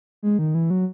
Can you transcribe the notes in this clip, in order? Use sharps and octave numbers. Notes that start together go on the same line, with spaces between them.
G#3
D#3
E3
F#3